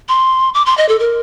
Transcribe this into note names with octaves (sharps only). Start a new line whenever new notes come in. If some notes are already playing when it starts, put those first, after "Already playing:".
C6
D6
C6
D#5
A4
A#4